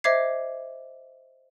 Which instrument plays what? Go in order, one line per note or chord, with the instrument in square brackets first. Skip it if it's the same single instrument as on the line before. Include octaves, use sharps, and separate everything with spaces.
[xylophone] C5 D#5 E5 D6 G#6 C7